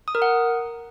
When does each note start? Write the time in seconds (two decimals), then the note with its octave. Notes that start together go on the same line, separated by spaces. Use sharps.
0.08 D#6
0.15 A#4
0.22 F#5